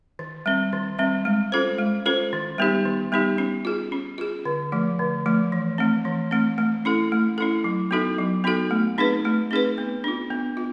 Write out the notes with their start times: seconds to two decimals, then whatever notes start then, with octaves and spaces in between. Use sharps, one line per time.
0.19 D#3
0.46 G3 C4
0.73 D#3
0.99 G3 C4
1.25 G#3
1.52 C#4 F4 A4 C5
1.78 G#3
2.06 C#4 F4 A4 C5
2.33 D#3
2.58 G3 B3 D#4 G4
2.86 D#3
3.12 G3 B3 D#4 G4
3.38 C#4
3.65 F4 G#4
3.92 C#4
4.18 F4 G#4
4.45 D3
4.72 F3 A3
4.99 D3
5.26 F3 A3
5.52 E3
5.78 A3 C4
6.05 E3
6.31 A3 C4
6.58 A3
6.85 C#4 E4 A4
7.12 A3
7.38 C#4 E4 A4
7.64 F#3
7.91 B3 D#4 F#4 A4
8.18 F#3
8.44 B3 D#4 F#4 A4
8.71 A3
8.98 C4 D#4 G#4 B4
9.25 A3
9.51 C4 D#4 G#4 B4
9.78 B3
10.04 D4 F4
10.31 B3
10.57 F4